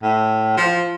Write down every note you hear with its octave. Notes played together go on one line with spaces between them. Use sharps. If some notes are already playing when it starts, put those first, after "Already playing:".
A2
F3